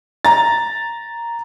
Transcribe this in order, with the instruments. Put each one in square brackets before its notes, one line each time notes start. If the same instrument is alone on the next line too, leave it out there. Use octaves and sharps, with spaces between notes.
[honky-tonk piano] A#5 A6